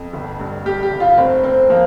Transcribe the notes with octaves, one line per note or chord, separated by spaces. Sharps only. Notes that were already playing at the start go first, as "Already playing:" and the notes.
Already playing: F2
G1
G2
G3 G4
G4
G1
F4
F1 C4
F1 C4
F3 A#3